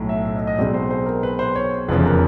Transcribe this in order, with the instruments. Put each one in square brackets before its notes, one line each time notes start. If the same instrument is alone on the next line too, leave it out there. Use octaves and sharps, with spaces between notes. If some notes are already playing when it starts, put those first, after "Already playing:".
Already playing: [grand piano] B1 A2 F#3
E5
E5
D#5
D#5
B1 B2 G#3 C4 D5
C5
C5
A#4
B4
C5
C#5
F1 E2 C#3 F3 B4
A#4